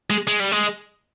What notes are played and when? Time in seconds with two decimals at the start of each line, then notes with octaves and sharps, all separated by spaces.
0.10 G#3
0.28 G#3
0.40 G3
0.52 G#3